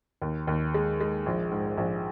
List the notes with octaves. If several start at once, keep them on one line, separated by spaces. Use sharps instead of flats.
D#2
D#2
G#3
G#3
A#1
G#2
A#1